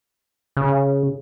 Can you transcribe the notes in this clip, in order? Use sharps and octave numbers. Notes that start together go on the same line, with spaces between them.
C#3